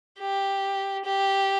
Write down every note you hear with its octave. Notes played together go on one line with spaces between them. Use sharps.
G4
G4